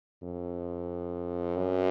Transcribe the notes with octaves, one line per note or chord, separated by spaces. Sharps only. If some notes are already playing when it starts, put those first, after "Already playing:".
F2
F#2